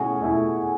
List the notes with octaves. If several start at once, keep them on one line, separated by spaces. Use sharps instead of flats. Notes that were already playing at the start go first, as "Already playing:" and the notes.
Already playing: B2 A3 C#4 E4 F#4 G#4
B2 A3 E4